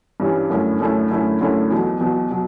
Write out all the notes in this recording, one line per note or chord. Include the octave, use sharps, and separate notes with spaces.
G2 E3 G3 C#4
F#2 D3 A3 C#4 E4
F#2 D3 A3 C#4 E4
F#2 D3 A3 C#4 E4
F#2 D3 A3 C#4 E4
E2 B2 F#3
E2 B2 F#3
B2 F#3